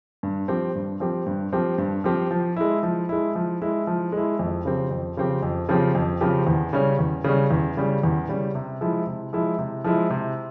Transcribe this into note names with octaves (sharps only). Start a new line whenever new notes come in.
G2
F3 C4 G4
G2
F3 C4 G4
G2
F3 C4 G4
G2
F3 C4 G4
F3
G#3 E4
F3
G#3 E4
F3
G#3 E4
F3
G#3
E4
F2
C#3 F3 C4 G4
F2
C#3 F3 C4 G4
F2
C#3 F3 C4 G4
F2
C#3 F3 C4 G4
E2
C#3 G3 C#4
E2
C#3 G3 C#4
E2
C#3 G3 C#4
E2
C#3 G3 C#4
C3
F3 G#3 E4
C3
F3 G#3 E4
C3
F3 G#3 E4
C3